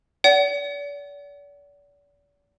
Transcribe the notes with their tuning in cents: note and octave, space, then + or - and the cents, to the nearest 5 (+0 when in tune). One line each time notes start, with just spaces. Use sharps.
D5 -40 F#5 +35